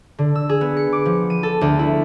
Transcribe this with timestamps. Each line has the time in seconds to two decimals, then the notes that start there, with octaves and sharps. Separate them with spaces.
0.18 D3
0.35 E6
0.49 G#4
0.61 B3
0.77 C#7
0.92 D6
1.06 F3
1.30 D#7
1.43 A4
1.61 D2
1.79 E4